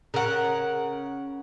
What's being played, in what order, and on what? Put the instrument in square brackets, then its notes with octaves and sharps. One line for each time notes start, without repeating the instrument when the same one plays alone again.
[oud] C#3 [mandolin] A#4 F#5